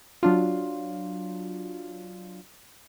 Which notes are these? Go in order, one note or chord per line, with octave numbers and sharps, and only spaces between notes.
F#3 D4 F4